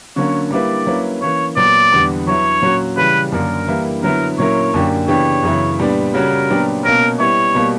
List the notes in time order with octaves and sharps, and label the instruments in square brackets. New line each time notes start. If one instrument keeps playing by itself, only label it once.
[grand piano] D3 F#3 A#3 C#4 [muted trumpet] C#5
[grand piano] G3 A#3 E4 B4 [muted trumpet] D5
[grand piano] F#3 A#3 C#4 E4 B4
[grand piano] E3 A#3 C#4 [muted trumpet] C#5
[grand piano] A#2 F#3 B3 [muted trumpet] D5
[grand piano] E2 D3 G3 B3
[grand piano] F#3 B3 E4 [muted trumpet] C#5
[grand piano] A#2 F#3 C#4 F#4
[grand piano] C#3 E3 G3 [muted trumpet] B4
[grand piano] F#2 D3 A#3 D4 [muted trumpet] A#4
[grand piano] E3 G3 A#3 E4
[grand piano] D3 F#3 B3 E4 [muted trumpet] A#4
[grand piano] A#2 F#3 C#4 E4 A#4 [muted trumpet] C#5
[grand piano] F#2 D3 A#3 D4 G4
[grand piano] C#3 E3 B3 D4 G4 [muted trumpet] C#5
[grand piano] F#2 C#3 E3 B3 E4
A#2 G3 B3 D4
[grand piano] C#3 G3 C#4 F#4 [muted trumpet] A#4
[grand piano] A#2 F#3 B3 D4 G4
[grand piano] B2 A#3 C#4 [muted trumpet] A#4
[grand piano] G3 B3 E4 [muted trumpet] C#5
[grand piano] B2 G3 A#3